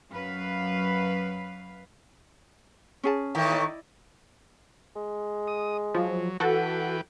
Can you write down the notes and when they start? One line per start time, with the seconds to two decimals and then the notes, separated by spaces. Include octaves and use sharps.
0.11 F#2 F#3 B4 F5
3.03 C#4 G#4 A5
3.35 A2 D#3 E3
3.50 E4 D5 D#5
4.96 G#3
5.48 D#6
5.94 F3 F#3
6.40 E3 F#4 A4 B4 G5